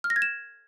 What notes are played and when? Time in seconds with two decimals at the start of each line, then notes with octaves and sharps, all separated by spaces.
0.04 F6
0.10 A#6
0.16 G#6
0.22 E7